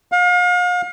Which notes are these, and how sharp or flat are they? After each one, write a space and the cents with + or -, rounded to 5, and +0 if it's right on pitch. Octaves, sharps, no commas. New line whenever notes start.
F5 +40